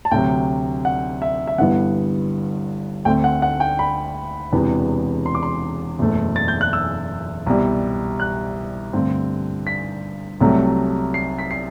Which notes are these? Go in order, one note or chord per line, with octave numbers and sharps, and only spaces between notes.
A5
D2 C3 F#3 G5
F#5
E5
E5
G1 G2 E3 G3 B3 F#5
D2 D3 A3 C4 G5
F#5
F#5
G5
B5
E1 E2 C3 E3 B3
C6
D6
C6
F#1 E2 B2 A3
A6
G6
F#6
E6
C2 B2 G3
F#6
G2 D3 A3 C4
B6
C2 C3 F#3 A3
C7
B6
C7